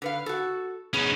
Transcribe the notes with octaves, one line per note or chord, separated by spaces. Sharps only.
D3 B4 F5
F#4 A4
B3 C#4 D#4 G#4